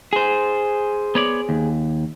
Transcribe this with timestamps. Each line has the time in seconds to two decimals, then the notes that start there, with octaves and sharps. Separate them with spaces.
0.13 G#4 C5
1.15 B3 C#5 D5
1.49 D#2